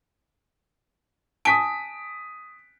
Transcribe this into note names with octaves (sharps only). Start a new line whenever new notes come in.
G#5 A5 D#6 B6 D7